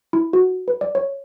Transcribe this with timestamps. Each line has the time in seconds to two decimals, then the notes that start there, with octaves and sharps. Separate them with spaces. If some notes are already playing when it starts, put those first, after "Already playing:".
0.13 E4
0.33 F#4
0.68 B4
0.81 D5
0.95 C#5